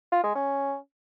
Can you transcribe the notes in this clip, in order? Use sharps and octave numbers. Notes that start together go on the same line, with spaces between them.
F4
G#3
C#4